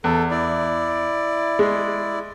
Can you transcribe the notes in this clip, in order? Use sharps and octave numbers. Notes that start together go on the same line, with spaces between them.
E2 A4
E4 D5
G#3